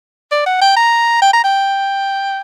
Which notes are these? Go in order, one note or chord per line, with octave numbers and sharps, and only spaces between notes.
D5
F#5
G5
A#5
G5
A#5
G5